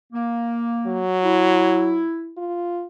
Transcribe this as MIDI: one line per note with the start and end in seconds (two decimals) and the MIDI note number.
0.13 1.00 58
0.87 2.05 54
1.23 2.33 64
2.38 2.86 65